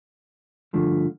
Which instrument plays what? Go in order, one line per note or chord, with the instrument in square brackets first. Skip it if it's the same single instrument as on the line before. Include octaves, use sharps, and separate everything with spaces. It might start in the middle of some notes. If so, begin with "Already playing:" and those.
[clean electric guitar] G2 D3 F3 A3